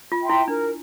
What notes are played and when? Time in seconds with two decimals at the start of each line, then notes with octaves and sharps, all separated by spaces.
0.12 F4
0.20 E5 G5 C6
0.30 E4
0.48 D4 A#4